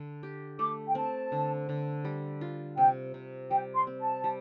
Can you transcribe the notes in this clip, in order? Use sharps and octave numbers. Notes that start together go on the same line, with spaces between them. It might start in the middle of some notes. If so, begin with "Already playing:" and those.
Already playing: D3
G4
A3 D6
G5
C4 A5
D3
D3
G3
F4
C3 G5
C3
G3 G5
C6
C4
A5
G3